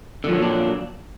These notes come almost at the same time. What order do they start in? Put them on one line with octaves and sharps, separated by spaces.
D3 F3 F#3 A#2 D4